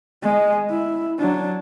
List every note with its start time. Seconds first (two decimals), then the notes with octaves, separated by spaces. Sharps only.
0.23 G#3 D#5
0.70 E4
1.19 F#3 D4